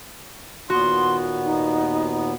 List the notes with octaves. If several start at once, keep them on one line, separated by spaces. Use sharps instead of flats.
D#2 A#2 B3 F#4 C6
D#4